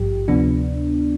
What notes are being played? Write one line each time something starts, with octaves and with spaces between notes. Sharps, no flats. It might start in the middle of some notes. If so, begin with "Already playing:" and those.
Already playing: G#1 G2 F3 G4
D2 C3 F3 B3 D4